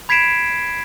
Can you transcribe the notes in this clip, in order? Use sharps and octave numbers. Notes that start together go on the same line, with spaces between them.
B5 G#6 B6 C7 D7 E7